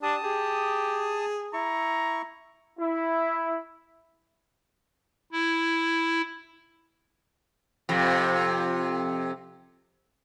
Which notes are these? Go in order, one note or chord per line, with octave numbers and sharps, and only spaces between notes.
D4 G4 A5 D#6
G4 G#4
E4 A#5 C#6
E4
E4
F2 C3